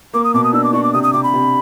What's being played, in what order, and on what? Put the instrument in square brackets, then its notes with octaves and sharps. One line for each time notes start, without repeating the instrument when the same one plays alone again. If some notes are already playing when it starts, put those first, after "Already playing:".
[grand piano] A#3 [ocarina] D6
[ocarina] D#6
[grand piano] B2 [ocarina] D6
[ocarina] D#6
[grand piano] D4 [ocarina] E6
[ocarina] D6
[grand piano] D4 [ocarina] C#6
[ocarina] D6
[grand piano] C3 [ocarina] D#6
[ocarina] D#6
[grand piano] C3 [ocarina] D6
[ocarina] B5
[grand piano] C3